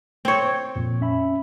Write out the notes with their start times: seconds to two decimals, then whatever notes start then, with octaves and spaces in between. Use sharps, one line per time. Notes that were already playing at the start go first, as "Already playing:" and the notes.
0.25 C4 C#5
0.76 F2 A#2
1.01 C#4 E5 B5